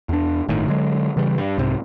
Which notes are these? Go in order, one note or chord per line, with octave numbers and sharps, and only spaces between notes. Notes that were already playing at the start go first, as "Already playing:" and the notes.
E2 D4
G1 A2 D#3
D3 F#3 G#3
C#3 E3 G3
G2
C2 G#2 C3